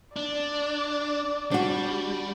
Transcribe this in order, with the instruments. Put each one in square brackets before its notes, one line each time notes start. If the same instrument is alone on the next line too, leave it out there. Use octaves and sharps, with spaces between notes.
[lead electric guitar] D4 [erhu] D5
[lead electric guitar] G3 [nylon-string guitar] D4 F#4